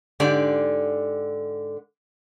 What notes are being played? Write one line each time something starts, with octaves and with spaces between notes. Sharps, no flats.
G#2 D3 G4 D5